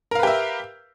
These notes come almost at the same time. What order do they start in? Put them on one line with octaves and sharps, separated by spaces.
A#4 F5 B4 G4 E5